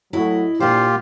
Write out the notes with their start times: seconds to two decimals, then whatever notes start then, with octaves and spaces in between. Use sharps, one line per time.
0.13 A2 F#3 E4 D#5
0.60 A#2 D4 F4 G4 C5